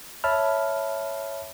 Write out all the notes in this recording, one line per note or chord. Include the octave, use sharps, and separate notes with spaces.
C#5 E5 A5 B5 F6